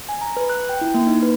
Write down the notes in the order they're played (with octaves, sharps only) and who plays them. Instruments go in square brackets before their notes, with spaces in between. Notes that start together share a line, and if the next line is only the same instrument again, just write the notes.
[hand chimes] G#5
A#5
B4
F#6
G5
E4
A#3
D#4
B4